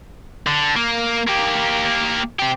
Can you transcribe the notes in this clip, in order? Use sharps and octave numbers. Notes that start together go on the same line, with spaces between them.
D3
A#3
A#3 G4
C4 G4